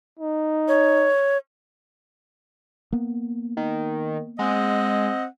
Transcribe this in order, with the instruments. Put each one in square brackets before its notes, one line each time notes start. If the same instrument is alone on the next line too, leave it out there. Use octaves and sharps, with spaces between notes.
[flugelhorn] D#4
[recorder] C#5
[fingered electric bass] A#3 B3
[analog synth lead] D#3
[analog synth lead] G#3 [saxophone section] C4 D#5 F#5